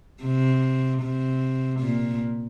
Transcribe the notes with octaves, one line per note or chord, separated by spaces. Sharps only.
C3
C3
A#2